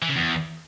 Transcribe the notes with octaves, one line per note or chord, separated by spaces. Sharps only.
E3
C#3
E2